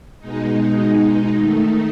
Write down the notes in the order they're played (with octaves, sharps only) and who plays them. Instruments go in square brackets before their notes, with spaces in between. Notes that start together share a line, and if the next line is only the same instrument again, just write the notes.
[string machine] B2 G#3 D#4
D#3 A3 D#4